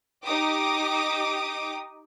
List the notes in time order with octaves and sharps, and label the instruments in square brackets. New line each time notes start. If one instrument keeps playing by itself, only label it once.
[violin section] D#4 G4 D6 D#6